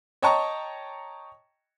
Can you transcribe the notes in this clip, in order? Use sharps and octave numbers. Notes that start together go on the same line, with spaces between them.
C#5 D#5 G5 A5 A#5 C#6